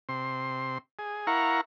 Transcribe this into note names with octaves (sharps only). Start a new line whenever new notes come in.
C3 C6
G#4
E4 A#4 F5 F#5 A#5 C#6